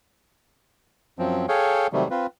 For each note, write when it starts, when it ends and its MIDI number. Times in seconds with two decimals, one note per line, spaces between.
1.19 1.46 42
1.19 1.46 53
1.19 1.46 54
1.19 1.46 60
1.49 1.87 68
1.49 1.87 69
1.49 1.87 73
1.49 1.87 77
1.49 1.87 79
1.93 2.08 48
1.93 2.08 51
1.93 2.08 54
1.93 2.08 55
1.93 2.08 57
2.11 2.27 60
2.11 2.27 65
2.11 2.27 71